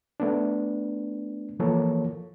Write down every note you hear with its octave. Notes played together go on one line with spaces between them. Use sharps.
A3 B3 D4
E3 F3 A#3 A4 C#5